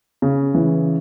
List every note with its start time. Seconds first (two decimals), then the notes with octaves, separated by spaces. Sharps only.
0.22 C#3
0.55 E3